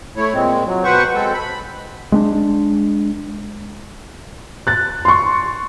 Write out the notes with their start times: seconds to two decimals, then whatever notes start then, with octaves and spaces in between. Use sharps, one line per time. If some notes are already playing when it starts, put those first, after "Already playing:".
0.17 A3 E4 C#5
0.34 A#2 G#3 C4
0.66 F#3
0.84 B2 B4 C5 F#5 C#6
1.15 G#3 C4 A4
1.34 B5
2.12 G#3 B3 D4
4.67 F#6 A6
5.05 C6 C#6